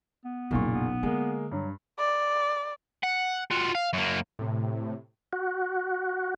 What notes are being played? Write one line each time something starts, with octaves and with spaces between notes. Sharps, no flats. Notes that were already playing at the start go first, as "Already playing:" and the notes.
B3
F#1 B1 A#2 F#3 C#6
B3
D3 G#3 A#3
G2 F#3
D5
F#5
F4 F#4
F5
F#2 A#3
A2 C3
F#4